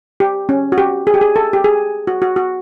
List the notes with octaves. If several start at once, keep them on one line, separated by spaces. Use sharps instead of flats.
G4
C#4
F#4
G4
G#4
G4
G#4
A4
G4
G#4
F#4
F#4
F#4